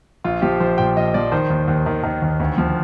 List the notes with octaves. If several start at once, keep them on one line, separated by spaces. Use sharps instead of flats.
A#1 F4
F3 G4
A#1 C5
A#2 G5
A#1 D#5
F3 D5
D#3 C5
D#2
D#2
D#3
D#3
D#2
D2
F3